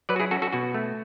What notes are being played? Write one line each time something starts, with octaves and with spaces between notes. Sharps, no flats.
F#3 B4 D5
F#4
E4 G#4
C#4 F#4 A4
F#4 A4
B2 F#4
A3